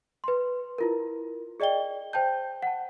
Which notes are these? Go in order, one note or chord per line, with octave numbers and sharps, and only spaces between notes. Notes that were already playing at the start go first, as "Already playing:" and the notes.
B4 C6
E4 F4 A#4
G#4 D5 D#5 G5 G7
C5 G5 A5 G6
F#5 A5